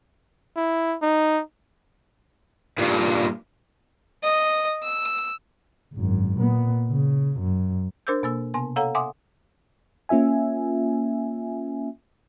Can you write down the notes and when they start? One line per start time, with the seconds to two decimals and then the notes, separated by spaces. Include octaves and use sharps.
0.57 E4
1.03 D#4
2.78 G2 A#2
4.24 D#5
4.83 E6
5.94 G#1 F#2
6.38 A#2 B3
6.91 C#3
7.40 F#2
8.07 D4 A#4 C5 D6 E6 G6
8.23 B2 A#3 E6
8.54 C3 B3 G#5
8.76 A4 C#5 F5 F#5 A#5 E6
8.95 E5 F#5 G#5 C6 D6 D#6
10.09 A#3 C#4 F4 E5 G#5